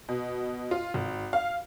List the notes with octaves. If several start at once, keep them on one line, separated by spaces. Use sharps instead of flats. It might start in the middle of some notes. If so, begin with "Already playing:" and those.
B2
F4
G#1
F5